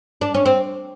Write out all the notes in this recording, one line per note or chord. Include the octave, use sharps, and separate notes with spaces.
D4
C#4
C4